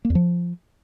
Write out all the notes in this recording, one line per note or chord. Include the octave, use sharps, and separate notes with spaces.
A#3
E2
F3